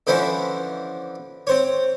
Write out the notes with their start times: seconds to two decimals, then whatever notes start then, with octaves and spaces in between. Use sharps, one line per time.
0.07 D3 E3 F3 C#4 E4 C5
1.47 C4 C5 C#5